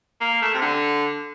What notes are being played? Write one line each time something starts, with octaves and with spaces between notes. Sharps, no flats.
A#3
A3
C3
D3